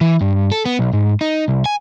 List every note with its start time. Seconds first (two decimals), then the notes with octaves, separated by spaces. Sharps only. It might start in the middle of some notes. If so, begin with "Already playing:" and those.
0.01 E3
0.21 G2
0.52 A4
0.66 B3
0.79 B1
0.93 G#2
1.21 D#4
1.48 C2
1.66 G#5